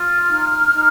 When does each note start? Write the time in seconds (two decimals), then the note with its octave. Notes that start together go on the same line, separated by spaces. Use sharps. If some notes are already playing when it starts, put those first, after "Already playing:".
Already playing: F4 F6
0.27 D#4
0.74 D#4